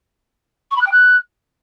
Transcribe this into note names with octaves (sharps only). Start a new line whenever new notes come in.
C#6
B5
F#6
G5
F#6